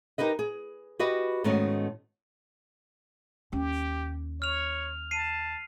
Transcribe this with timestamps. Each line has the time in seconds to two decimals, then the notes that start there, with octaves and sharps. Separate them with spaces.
0.18 D#4 G4 A#4 B4 D#5
0.39 G#4
0.99 F#4 G4 B4 D#5
1.44 G#2 D#3 A3 B3 C#4 F#4
3.53 D#2 C#4 G4
4.42 C#5 F6 F7
5.11 A5 C7 D#7